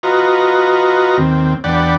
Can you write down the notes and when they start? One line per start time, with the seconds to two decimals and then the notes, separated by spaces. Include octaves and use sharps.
0.03 F4 F#4 B4 D#5 A#5
1.17 D#2 C4
1.64 E2 D4 D5 F#5 G5 B5